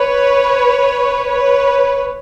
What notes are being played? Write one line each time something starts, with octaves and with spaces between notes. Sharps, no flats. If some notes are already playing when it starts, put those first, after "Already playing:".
Already playing: B4 C#5
B4 C#5